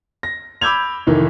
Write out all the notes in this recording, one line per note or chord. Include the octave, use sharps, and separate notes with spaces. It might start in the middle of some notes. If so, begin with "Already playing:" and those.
A#6
B5 D6 E6 G6 G#6 F7
F1 D#3 E3